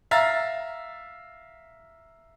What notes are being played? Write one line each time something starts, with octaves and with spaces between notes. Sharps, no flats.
E5 F5 A#5 A6